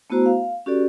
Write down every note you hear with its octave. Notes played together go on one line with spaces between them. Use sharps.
A3 B3 E4 F#4 C5 A#5
F5
C#4 F#4 G4 A4 D5